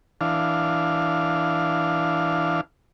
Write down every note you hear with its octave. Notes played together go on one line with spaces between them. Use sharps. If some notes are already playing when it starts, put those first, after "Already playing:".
E3 D4 F5